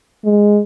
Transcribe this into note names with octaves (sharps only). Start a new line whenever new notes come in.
G#3